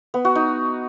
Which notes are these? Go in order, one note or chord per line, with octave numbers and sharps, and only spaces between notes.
B3
F#4
D#4